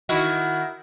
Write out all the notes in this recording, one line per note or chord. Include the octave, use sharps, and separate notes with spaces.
D#3 E4 F#4